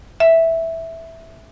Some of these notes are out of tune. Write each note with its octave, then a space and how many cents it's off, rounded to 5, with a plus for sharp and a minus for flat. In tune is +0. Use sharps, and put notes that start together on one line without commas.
E5 -5